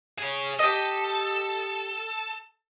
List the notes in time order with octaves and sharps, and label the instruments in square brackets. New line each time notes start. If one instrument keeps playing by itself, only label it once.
[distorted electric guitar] G#4 C#5
[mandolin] G4 D#5 [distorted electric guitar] A4